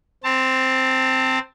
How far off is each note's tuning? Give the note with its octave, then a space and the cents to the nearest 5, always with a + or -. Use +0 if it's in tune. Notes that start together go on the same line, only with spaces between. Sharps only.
C4 +0 A5 +25